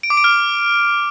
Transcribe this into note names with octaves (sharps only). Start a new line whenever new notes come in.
D7
D6
D7
F6